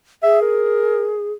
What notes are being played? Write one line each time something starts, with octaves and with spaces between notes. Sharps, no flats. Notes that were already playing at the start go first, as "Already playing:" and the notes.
G#4 E5
A#4